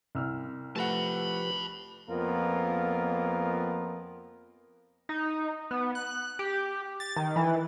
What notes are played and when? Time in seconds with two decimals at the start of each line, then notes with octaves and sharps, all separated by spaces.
0.15 C2 E6 F6
0.76 F3 A3 G4 B4 F#5 A5 B5
2.08 F2 A#3 B3 F4 A#4
5.09 D#4
5.71 B3
5.95 F#6
6.39 G4
7.00 A6
7.16 D#3
7.36 E3